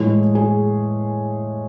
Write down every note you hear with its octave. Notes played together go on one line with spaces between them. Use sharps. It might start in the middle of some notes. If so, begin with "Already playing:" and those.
Already playing: A2 E3 G#3 G#4
G#4